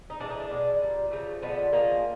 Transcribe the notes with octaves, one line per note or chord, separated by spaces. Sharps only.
D#4
A2 E3 G#3 D4
D#4
D4
B2 G#3
A#2 G3
C#3 F3 A3
D3 F3 G#3 B3
C#3 F3 G#3 A#3